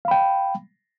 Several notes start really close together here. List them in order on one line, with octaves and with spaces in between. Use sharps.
F5 B5 G5